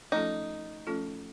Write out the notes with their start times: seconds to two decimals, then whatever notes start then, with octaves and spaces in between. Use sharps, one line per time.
0.12 F3 A3 C#4 D#4 F4 A4
0.87 F3 A3 C#4 F4 A4